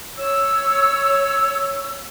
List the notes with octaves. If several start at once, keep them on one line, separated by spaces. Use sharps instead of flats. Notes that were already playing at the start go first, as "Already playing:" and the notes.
C#5 E6